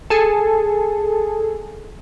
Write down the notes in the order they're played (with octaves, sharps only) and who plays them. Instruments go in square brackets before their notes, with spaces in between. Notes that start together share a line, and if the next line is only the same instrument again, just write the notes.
[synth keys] G#4 A4